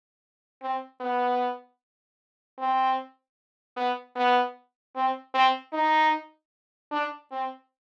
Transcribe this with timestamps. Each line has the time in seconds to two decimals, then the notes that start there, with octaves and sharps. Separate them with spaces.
0.62 C4
1.01 B3
2.59 C4
3.76 B3
4.16 B3
4.96 C4
5.34 C4
5.73 D#4
6.91 D4
7.32 C4